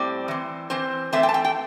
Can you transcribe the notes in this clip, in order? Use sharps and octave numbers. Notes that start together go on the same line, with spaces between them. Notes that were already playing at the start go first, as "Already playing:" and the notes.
Already playing: A2 G3 C4 D5
E3 C4
E3 C4 C5
E3 A3 C4 E5
G5
A5
G5
G5